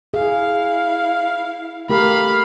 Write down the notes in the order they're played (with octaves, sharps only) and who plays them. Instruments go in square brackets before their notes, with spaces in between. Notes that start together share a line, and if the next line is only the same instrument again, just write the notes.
[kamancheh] E4 F5 [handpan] G#4
[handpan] A3 G4 A#4 [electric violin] F5 B5